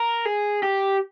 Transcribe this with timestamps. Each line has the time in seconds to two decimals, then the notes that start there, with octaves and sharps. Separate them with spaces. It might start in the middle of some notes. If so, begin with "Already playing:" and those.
Already playing: A#4
0.25 G#4
0.63 G4